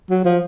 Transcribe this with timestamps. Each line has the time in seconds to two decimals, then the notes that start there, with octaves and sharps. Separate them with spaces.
0.10 F#3
0.25 F3